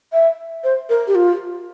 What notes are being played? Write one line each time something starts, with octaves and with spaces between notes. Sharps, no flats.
E5
C5
A#4
G4
F4